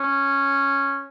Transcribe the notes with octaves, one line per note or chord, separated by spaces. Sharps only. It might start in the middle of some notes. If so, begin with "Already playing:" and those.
Already playing: C#4